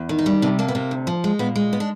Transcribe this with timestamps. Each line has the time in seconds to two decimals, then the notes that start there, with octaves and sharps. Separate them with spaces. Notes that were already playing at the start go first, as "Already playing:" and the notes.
Already playing: E2
0.09 D#3
0.18 D#4
0.26 G3
0.42 C3 D4
0.59 A#3 D4
0.68 B3
0.75 C3 C4
0.91 D2
1.07 F3
1.24 G#3
1.39 A#2 B3
1.56 G#3
1.73 B3
1.80 D4